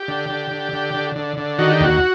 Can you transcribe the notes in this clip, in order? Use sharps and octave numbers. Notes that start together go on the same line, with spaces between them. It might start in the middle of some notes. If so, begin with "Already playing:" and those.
Already playing: G4
D3
D3
D3
D3
D3
D3
D3
D#3 F#4
G4
D#2 F#4